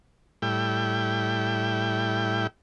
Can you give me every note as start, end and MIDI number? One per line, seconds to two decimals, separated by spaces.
0.42 2.47 45
0.42 2.47 55
0.42 2.47 64
0.42 2.47 79